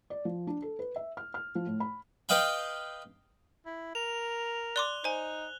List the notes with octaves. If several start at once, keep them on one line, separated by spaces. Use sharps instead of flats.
D5
F3
D4
A4
B4
E5
F6
F6
F3
A2
B5
B4 D#5 F5 G5 B5
E4
A#4 F7
D5 C6 D6 F#6 G7
D#4 C5 G#5